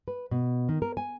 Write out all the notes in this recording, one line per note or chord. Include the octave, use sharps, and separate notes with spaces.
B4
B2
D#3
A#4
G#5